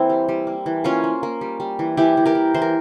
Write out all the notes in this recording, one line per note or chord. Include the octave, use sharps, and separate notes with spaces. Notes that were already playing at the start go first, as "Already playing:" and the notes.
Already playing: E3 A#3 C4 E4
G3
G3
A#3
E3
A#3 C#4 F4
A#3
A#3
G3
G3
E3
E3 E4 G4
E3
G4 A#4
E3
E3 C5
A#4